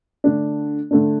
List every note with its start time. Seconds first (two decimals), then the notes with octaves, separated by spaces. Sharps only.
0.24 D3 A3 D4
0.91 D3 A3 D4